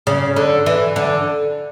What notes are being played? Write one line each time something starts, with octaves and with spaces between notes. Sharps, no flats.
C#3
D3
E3
D3